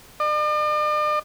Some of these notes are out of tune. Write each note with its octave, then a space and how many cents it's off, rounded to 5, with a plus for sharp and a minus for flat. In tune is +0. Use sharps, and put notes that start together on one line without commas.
D5 +45